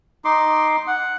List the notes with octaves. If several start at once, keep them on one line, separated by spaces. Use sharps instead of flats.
D#4 C6 D6
F#5